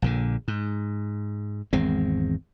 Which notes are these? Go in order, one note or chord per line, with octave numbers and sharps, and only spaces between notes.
A#1 A#2 D3
G#2
G#1 E2 G#3 C4